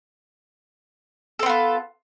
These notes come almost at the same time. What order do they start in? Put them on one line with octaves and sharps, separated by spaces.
A4 C4 B3 F4